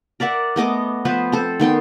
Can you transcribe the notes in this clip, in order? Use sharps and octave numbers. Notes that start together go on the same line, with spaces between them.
A#4 D5 E5 F#5
A3 B3 D#5 D6
F3 B3 B4 C5
C4 A4 C5
D#3 B3 G5 C6